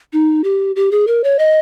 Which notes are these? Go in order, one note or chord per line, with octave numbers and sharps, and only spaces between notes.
D#4
G4
G4
G#4
A#4
C#5
D#5